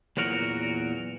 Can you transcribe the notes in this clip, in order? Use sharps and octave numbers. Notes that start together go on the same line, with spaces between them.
E2 A#2 F#3 F#4 A#4